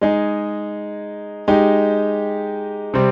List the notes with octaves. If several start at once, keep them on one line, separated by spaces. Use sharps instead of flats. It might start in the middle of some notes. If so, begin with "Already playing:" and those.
G#3 D#4 G#4
G#3 D#4 G4
C3 G3 C4